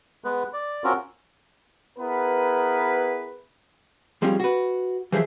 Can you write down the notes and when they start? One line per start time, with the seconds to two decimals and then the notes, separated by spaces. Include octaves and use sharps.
0.24 G#3 B3 B4
0.53 D5
0.84 C4 C#4 F4 F#4 A#4
1.99 B3 E4 G#4 A#4 B4
4.22 F3 G3 G#3 C4 C#4 F4
4.40 F#4 B4
5.12 E3 F3 G#4 C5 E5